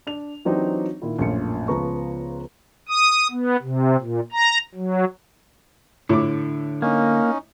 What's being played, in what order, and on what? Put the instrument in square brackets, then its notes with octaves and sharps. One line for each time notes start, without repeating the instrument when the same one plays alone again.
[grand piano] D4 F7
E3 F#3 C4 D4 D#4 G4
A#2 D#3 E4 F4
A#1 F#2 A2 A#3 F4 C#7
C#2 F3 B3 B4 A#5 C#6
[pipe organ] D#6
B3
C3
A#2
A#5
F#3
[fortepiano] A2 D6 [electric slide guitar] D3
[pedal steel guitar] A#3 [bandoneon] C#4 D#4